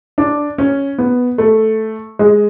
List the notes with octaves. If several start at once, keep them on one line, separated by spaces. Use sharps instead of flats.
D4
C#4
B3
A3
G#3